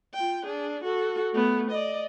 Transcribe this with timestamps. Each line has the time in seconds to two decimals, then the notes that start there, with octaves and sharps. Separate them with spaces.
0.14 F4 G5
0.46 D4 G#4
0.84 F#4 A4
1.33 A3 B3
1.71 D5 D#5